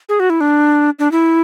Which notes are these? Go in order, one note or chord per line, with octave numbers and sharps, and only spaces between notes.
G#4
F#4
E4
D4
D4
E4